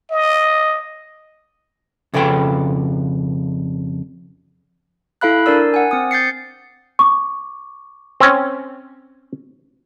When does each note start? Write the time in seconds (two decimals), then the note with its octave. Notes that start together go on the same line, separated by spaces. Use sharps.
0.11 D#5
2.14 F2 C#3 A4 B4 G5
5.21 E4 A4 F5 B5 F#6
5.46 D4 A#4 D5 E6
5.74 F#5 G#5
5.91 C4 D#6
6.11 G6 A6 C7 C#7
6.99 C#6 D6
8.20 C4 C#4